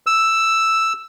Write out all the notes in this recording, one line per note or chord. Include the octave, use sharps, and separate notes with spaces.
E6